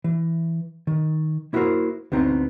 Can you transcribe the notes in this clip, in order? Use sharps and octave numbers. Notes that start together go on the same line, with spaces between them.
E3
D#3
A#3 E4 F#4 G#4 A#4 C5
D2 B3 C4 D#4 A#5